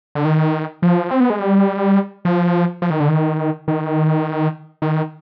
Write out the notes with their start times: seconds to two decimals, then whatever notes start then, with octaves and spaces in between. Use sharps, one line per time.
0.15 D3
0.25 D#3
0.82 F3
1.11 C4
1.20 B3
1.30 G#3
1.39 G3
2.25 F3
2.82 F3
2.90 D#3
3.00 D3
3.09 D#3
3.68 D#3
4.82 D#3